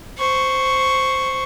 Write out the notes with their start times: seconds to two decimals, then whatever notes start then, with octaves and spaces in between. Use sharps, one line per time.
0.18 C5 C#6